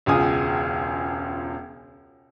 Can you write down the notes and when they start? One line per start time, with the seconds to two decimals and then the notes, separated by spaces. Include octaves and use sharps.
0.06 E1 C#2 F4 G#5 D#6